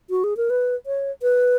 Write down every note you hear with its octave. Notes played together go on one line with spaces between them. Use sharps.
F#4
G#4
A#4
B4
C#5
B4